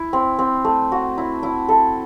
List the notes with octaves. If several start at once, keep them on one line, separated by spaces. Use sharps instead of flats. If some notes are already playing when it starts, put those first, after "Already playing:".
Already playing: E4
C4
C4
A3
F#4
E4
E4
A4